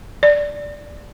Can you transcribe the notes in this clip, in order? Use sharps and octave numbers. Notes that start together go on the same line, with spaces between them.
D5